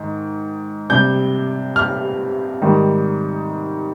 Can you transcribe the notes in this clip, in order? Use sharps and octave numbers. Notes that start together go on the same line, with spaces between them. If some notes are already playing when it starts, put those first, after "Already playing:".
Already playing: G#2 D#3
C3 G3 D4 G6
F6
G#2 D#3 G3